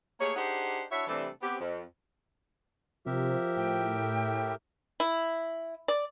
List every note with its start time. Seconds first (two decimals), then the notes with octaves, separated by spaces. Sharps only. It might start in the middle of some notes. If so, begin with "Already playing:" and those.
0.20 A3 A#3 G4 G#4 C#5
0.36 D4 D#4 G4 G#4 C5 F#5
0.91 D4 E4 F#4 C#5 E5
1.07 C3 E3 G3 A3 C4 D4
1.42 B3 C4 G4
1.60 F2
3.06 C3 F3 G4 A#4 E5
3.56 A2 G5
5.00 E4
5.88 D5